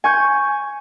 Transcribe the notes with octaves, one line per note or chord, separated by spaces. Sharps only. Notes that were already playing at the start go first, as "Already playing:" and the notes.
G#5 C#6 G6